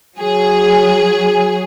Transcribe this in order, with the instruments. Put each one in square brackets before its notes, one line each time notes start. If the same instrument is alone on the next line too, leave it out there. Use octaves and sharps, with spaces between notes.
[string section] F#3 G#4